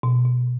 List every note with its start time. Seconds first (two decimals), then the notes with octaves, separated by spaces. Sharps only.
0.03 B2
0.25 B2